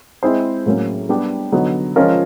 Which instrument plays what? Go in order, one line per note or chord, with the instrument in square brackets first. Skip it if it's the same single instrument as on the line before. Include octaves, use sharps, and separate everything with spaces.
[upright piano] G#3 C4 E4 G#4 C5
A2 F#3 A#3 C#4
G3 B3 D4 G4
D3 F#3 B3 D#4
F3 G#3 C#4 F4 A#4